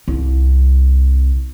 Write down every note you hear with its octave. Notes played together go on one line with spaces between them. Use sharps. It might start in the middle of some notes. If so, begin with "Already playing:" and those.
C2